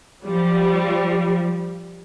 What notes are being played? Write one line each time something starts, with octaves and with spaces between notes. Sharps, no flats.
F3 G3